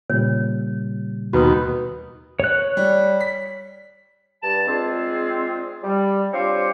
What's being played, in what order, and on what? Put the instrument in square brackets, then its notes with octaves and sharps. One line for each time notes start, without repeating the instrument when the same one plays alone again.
[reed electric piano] A#2 C#3 G3 [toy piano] C#5
[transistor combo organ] D#2 B2 [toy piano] F#4 B4 D#6
[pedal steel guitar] C#5 F#6
[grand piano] G3
B6
[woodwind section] G2 A5
G#3 C4 D4 F4 G#4
G3
C4 D4 F4 G4 C5 C#5